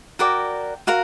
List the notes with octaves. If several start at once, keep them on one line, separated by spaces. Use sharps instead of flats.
F#4 A#4 D5 G5
F#4 A#4 F5